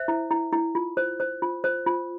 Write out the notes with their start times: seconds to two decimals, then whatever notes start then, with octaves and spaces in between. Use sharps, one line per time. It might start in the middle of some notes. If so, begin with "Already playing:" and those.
Already playing: C5 E5
0.08 E4
0.31 E4
0.52 E4
0.75 F4
0.97 C5
1.20 C5
1.42 F4
1.64 C5
1.86 F4